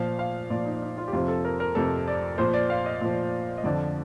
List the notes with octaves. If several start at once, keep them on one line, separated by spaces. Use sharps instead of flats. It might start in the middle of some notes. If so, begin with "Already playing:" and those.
Already playing: A#2 F3 F5
F5
A#2 F3 D5
D#4
D#4
F4
G4
F2 C3 F3 F4
A4
A#4
A#4
F2 C3 F3 A4
D5
A#2 F3 C5
D5
F5
D#5
A#2 F3
D#5
F2 D3 F3 D5